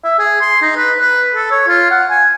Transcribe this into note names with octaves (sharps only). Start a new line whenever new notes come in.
E5
G#4
C6
D#4
B4
B4
A4
C#5
F4
F#5
G#5